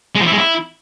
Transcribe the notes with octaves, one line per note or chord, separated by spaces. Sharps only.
G#3
F3
E4
G#3
E4